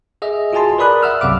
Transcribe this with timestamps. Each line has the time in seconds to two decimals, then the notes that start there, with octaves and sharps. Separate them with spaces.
0.22 G#4 D#5 E5
0.53 F4 F#4 G#4 G#5 A5 C6
0.78 A#4 B4 D5 B5 D#6 F#6
1.02 E5 F#5 E6 F6
1.21 C2 F#2 C3 F5 D6